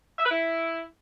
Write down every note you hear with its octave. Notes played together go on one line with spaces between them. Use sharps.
E5
B4
E4